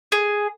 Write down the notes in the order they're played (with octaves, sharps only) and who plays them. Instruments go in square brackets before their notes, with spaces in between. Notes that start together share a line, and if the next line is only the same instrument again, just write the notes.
[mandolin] G#4